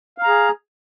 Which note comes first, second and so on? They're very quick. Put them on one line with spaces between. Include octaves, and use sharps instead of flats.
F5 A#5 G#4